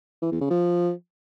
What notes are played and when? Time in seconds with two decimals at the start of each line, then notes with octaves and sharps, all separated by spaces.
0.22 E3
0.31 E2
0.41 C#3
0.50 F3